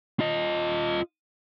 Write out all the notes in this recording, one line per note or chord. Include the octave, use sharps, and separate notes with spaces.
F4 D#5